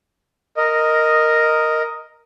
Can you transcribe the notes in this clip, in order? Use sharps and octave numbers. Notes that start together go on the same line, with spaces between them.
A#4 D#5